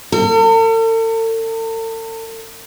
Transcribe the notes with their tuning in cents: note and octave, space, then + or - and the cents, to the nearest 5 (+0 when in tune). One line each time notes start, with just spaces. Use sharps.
A4 +45